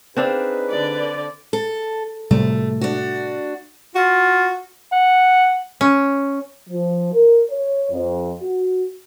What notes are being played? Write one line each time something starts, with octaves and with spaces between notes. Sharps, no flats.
C4 D4 D#4 G#4 B4 F5
D3 D5
A4
A2 C3 G3 A3
D4 F#4
F4 F#4
F#5
C#4
F3
A#4
C#5
F2
F#4